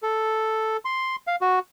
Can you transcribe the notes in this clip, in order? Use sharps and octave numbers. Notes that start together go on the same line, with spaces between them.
A4
C6
F5
F#4